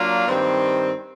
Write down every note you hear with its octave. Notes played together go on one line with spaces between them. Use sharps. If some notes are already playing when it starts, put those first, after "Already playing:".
Already playing: F#3 A#3 D4 F4
G2 D#3 G3 C4